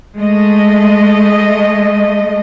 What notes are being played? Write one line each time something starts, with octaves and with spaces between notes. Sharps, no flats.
G#3 A3 D#5